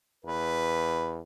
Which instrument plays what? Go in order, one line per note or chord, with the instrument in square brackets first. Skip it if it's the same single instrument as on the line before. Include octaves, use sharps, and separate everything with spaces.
[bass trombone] E2 [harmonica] B4